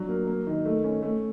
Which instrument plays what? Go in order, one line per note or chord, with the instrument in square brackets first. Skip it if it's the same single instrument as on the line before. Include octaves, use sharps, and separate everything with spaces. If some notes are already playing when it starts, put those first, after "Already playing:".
Already playing: [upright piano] F#3 D4
A#3
A#3
D#3
A3
C#4
A3